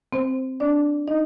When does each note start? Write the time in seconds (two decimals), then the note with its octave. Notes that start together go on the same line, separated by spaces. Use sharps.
0.13 C4 C5
0.60 D4 D5
1.08 D#4 D#5